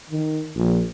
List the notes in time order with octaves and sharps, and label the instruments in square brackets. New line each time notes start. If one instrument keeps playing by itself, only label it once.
[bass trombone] D#3
A#1